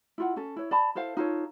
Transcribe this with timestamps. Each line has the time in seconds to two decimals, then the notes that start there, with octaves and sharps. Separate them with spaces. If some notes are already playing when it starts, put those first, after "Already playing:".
0.18 E4 F4 F#5
0.36 C#4 A4
0.56 E4 C#5
0.71 D5 A5 B5
0.95 E4 A4 C5 F5
1.17 D#4 F4 A4 C#5